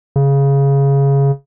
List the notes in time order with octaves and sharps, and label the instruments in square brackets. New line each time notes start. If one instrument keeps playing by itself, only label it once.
[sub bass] C#3